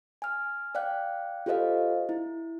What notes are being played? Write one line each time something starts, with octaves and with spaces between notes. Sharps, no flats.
G#5 F6
D5 F5 G5 F#6
F4 G4 A4 C5 D#5 F5
E4